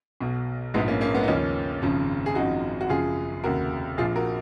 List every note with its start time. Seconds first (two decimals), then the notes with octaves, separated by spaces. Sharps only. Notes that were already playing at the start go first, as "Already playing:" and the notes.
0.21 B1 B2
0.74 A#1 G#2 F3 G#3 B3
0.88 A#3 C#4
1.01 A#3 C#4
1.14 G#3 B3
1.23 D#4
1.28 D#2 C#3 F3 A#3 C#4
1.82 G#1 F#2 C#3 F3
2.26 G#4
2.35 G#1 F#2 F3 D#4 F#4
2.81 F#4
2.89 F#1 F#2 F3 F4 G#4
3.44 F1 D#2 C#3 F#4 A#4
3.97 A#1 A#2 F3 F4 G#4
4.15 F#4 A#4